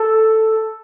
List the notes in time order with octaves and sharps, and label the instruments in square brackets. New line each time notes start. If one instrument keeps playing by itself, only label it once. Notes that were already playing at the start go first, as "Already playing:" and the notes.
Already playing: [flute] A4